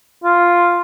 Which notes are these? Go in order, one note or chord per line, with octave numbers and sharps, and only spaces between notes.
F4